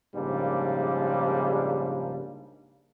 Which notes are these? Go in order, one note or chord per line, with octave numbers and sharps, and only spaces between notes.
A#1 G#2 C#3 G3 A#3 D4